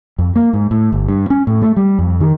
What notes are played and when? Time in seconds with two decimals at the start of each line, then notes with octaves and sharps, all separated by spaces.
0.19 F2
0.36 A#3
0.53 G#2
0.71 A2
0.92 G1
1.09 G2
1.30 C#4
1.47 A2
1.62 A3
1.77 G3
1.99 F2
2.21 D#3